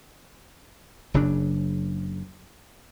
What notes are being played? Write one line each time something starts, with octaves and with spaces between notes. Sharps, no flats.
F#1 C#3 F#3 D4